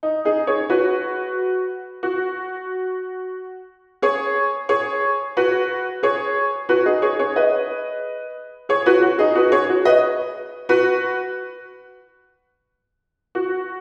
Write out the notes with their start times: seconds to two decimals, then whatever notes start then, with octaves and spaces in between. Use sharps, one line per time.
0.03 D#4
0.25 D#4 G#4
0.47 G#4 C#5
0.70 F#4 B4
2.03 F#4
4.02 G#4 C#5
4.69 G#4 C#5
5.37 F#4 B4
6.03 G#4 C#5
6.69 F#4 B4
6.86 D#4 G#4
7.02 G#4 C#5
7.19 G#4 C#5
7.36 B4 D#5
8.69 G#4 C#5
8.86 F#4 B4
9.02 F#4
9.19 D#4 G#4
9.35 F#4 B4
9.52 G#4 C#5
9.69 F#4
9.85 B4 D#5
10.69 F#4 B4
13.35 F#4